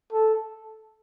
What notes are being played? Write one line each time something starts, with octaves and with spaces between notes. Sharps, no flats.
A4